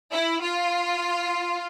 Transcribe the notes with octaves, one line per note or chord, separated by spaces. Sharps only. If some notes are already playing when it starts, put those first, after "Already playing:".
E4
F4